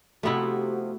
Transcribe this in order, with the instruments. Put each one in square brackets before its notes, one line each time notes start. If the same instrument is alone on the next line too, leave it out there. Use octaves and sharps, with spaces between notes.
[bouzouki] C3 F3 [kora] A3 B3 E4 [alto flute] F#4